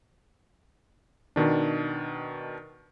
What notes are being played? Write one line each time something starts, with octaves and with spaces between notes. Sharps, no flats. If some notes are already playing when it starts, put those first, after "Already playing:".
B2 D#3 D4